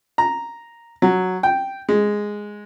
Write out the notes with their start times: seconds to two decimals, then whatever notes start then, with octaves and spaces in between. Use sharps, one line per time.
0.18 A#5
1.02 F#3
1.43 G5
1.89 G#3